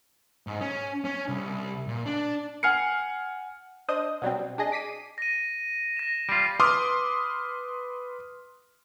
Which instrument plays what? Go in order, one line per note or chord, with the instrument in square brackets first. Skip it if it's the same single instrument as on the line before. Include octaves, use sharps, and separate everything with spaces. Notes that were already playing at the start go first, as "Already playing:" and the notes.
[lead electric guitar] G#2
C#4
C#4
C2
A#2
D4
[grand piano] F#5 G#5 F6 C7 C#7
[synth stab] D4 C5 D#5 D#6
B2 F#3 G3 C4
D4 G#4 D#5
D6 B6 C7 D#7
[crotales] A#6 D#7
A#6 E7
[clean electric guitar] G3 F4 [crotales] B6 C7 D7
[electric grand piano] B4 C6 D6 D#6 F6